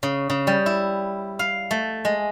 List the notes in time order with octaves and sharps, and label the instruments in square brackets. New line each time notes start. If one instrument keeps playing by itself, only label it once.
[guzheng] C#3
C#3
G3
E4
F5
A3
G#3